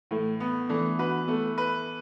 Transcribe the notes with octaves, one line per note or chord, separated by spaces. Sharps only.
A2 E3 A3
B3
E3 A3 D4
D4 F#4 B4
A3 B3 E4
B4